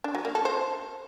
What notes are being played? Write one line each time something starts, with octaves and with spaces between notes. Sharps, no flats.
D4
F#3
A#3
A4
C5